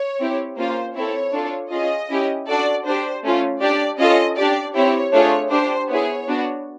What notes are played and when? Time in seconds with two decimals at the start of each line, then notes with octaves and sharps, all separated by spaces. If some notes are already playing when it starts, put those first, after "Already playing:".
Already playing: C#5
0.20 C4 E4 G4
0.57 A#3 C#4 F4 C5
0.96 C4 E4 A4 C#5
1.34 D4 F4 A4
1.72 C#4 F4 G#4 D#5
2.10 C#4 E4 G4
2.47 D4 F#4 A4 D5
2.86 D4 G4 C5
3.24 A3 C#4 F4
3.61 D4 G4 D5
3.99 C#4 F4 A4 D#5
4.37 D4 G4 D5
4.75 C4 E4 G4 C#5
5.13 A3 D4 F4 G#4 C#5
5.51 D4 G4 C5
5.89 B3 E4 G#4 C#5
6.27 B3 D4 F#4